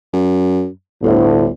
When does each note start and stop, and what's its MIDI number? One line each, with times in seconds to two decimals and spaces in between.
0.13 0.67 42
1.03 1.49 31
1.03 1.44 38
1.03 1.44 45